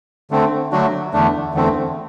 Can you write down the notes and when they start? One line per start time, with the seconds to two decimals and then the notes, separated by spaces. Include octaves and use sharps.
0.31 D3 A3 C4
0.72 D3 F#3 A3 D4 F#4
1.13 E2 D3 A3 D4
1.54 E2 D3 A3 C4